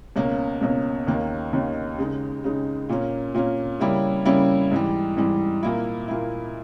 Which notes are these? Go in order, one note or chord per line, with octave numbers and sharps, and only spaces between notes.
C#2 B2 A#3 C#4
C#2 B2 A#3 C#4
D#2 D#3 A#3 C#4
D#2 D#3 A#3 C#4
C#3 G#3 D#4
C#3 G#3 D#4
A#2 A#3 C#4
A#2 A#3 C#4
C#3 G3 A#3 C#4 E4
C#3 G3 A#3 C#4 E4
G#2 E3 G3
G#2 E3 G3
A#2 A#3 E4
A#2 A#3 E4